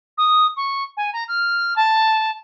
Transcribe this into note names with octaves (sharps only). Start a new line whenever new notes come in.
D#6
C#6
G#5
A#5
F6
A5